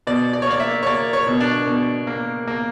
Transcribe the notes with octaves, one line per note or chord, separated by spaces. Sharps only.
B2 D5
D5
C#5
A#3 D5
E5
C#5
A#3 D5
C#5
B2
D4
B2
A#3
A#3